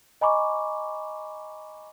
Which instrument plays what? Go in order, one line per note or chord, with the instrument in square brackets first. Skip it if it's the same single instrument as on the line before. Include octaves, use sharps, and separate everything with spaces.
[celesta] D#5 G#5 A#5 B5 C#6 D6